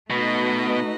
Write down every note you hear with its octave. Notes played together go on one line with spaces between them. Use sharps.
B2 A3 D#4 F#4 B4 D#5